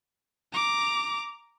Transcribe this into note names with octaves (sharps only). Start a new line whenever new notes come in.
A#5 D6